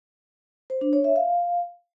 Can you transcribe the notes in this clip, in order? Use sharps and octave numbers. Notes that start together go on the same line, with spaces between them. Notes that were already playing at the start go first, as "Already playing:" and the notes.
C5
D4
C#5
E5
F5